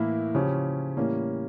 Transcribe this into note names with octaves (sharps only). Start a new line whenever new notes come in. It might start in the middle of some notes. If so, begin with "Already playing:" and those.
Already playing: A2 E3 A#3 E4 A#4
C#3 F3 C#4 G4
A2 E3 G3 A#3 C#4